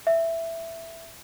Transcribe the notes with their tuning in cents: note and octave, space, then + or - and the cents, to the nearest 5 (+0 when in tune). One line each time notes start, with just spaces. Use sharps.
E5 +5